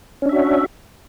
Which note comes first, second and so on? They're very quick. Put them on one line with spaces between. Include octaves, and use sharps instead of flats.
C#4 D4 E5 F#4